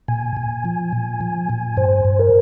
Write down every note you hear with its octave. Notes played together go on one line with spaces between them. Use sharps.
A#2 G#5
A#2
F3
A#2
F3
A#2
G2 C5
G2
A#4